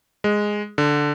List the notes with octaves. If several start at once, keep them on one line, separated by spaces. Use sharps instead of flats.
G#3
D3